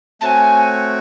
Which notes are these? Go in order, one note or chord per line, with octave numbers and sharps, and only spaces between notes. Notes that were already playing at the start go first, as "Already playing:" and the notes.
A3 C4 F#4 C#5 G#5 A5